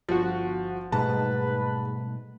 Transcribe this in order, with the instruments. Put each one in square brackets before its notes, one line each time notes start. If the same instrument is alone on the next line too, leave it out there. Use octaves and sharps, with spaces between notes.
[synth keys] G1 F#4 [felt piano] F3
[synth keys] G#2 [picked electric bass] B2 G3 A3 [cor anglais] B4 [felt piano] A5